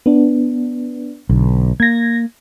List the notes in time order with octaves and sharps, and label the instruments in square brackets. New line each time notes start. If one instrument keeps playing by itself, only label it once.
[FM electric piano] B3 D4
[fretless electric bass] B1 [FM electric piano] D3
[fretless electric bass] A#3 [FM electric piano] G#6 A#6